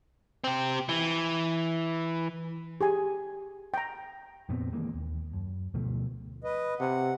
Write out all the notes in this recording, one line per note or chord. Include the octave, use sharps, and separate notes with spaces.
C4 G4
E3
G4 G#4 G#5
G5 A#5
F2 A#2 B3 C4
D#3 E3 G#3 A#3
D#2
F#2
D2 B2 F3 A3
B4 D#5
C3 F#5